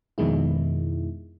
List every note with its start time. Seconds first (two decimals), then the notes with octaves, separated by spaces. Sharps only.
0.18 F2 B2 D#3 G#3 E4